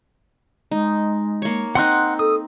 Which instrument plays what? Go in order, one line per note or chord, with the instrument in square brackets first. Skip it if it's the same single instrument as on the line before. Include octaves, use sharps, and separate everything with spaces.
[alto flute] G#3 [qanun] D#4
[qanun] A#3 C#5
[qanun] C4 D#4 [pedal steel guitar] F#5 C6 F#6
[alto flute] A4 [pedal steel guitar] D#6